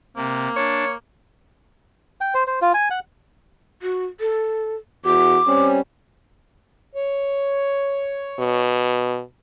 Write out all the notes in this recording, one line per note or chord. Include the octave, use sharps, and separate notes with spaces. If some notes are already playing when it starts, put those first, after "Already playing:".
C3 A#3
D4 C#5
G5
C5
C5
F4
G#5
F#5
F#4
A4
E2 F#4 D6
G3 C4 C#4
C#5
B2